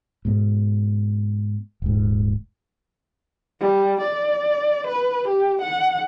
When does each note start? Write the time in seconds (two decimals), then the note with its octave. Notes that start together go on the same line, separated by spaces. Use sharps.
0.25 G#2 B2
1.82 D#1 G#2
3.61 G3
4.01 D5
4.87 B4
5.28 G4
5.62 F#5